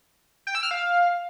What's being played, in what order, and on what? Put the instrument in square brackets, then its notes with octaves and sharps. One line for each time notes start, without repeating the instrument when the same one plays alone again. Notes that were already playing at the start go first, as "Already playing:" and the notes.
[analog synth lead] G5
E6
F6
F5